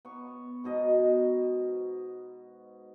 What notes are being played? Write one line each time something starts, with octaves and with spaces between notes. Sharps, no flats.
B3 C#6
G#2 B2 D#5